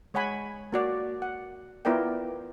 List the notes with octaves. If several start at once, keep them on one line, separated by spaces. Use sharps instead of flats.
G#3 C#5 F#5 G#5 B5
A#3 F#4 D5
F#5
B3 E4 F4 A#4 D5 G5